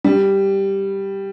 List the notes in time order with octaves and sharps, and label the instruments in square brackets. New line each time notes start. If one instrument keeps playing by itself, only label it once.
[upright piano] G3